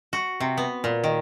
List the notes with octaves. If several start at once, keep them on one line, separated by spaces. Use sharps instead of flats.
F#4
C3
B3
A#2
D#3